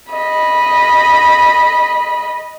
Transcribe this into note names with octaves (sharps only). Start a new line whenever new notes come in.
D#5 B5